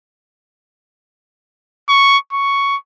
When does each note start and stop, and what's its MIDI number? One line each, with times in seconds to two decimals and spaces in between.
1.89 2.18 85
2.33 2.77 85